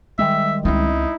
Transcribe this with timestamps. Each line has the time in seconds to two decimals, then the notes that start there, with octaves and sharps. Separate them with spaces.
0.19 D#3 G3 G#3 E5
0.65 C#2 C4 D#4 E4